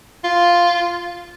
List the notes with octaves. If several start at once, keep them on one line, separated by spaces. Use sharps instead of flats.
F4